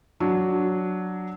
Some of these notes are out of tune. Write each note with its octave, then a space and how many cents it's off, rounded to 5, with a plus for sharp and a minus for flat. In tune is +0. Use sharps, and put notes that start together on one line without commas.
F#3 +0 D4 +0